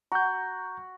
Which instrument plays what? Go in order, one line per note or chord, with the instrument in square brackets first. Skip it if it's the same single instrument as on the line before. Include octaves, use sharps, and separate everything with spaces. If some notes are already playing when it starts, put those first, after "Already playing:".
[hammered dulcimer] F#4 [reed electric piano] A#5 G6